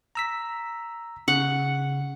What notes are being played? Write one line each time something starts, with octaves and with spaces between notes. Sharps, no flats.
A#5 E6 B6
C#3 F#5